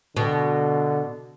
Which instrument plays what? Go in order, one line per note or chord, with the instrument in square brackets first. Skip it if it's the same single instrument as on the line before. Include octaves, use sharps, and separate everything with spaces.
[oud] B2 [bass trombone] D3